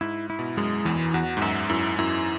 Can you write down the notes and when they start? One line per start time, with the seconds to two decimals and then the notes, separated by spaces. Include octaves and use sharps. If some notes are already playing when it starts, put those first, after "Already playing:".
0.01 G#2 E4
0.30 E4
0.39 B2
0.57 F#2 G#3
0.85 E2 E3
1.14 E2 F#4
1.37 G#2
1.42 F#2 E5
1.69 F#2 E4
1.99 F#2 E4